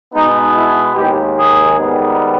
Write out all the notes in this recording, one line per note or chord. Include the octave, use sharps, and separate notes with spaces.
B2 G#3 B3 D#4
E4
D#2 D#3 G#3 G4
G#4
G#2 D#3 G3 B3